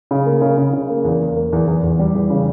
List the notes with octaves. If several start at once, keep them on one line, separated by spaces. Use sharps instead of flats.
C#3
A#3
C#3
C#3
C#3
A#3
E2
A#3
A#3
E2
E2
E2
G3
E2
C#3